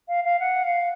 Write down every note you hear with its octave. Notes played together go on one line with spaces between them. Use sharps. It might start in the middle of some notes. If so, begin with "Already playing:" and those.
F5
F5
F#5
F5